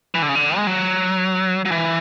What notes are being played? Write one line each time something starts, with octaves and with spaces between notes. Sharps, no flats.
E3
D3
C#3
D3
G#3
F#3
F#3
E3